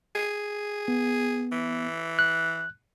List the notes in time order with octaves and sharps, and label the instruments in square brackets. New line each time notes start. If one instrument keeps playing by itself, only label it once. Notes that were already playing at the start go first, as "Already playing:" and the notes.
[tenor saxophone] G#4
[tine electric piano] B3
[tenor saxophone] E3
[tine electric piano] F#6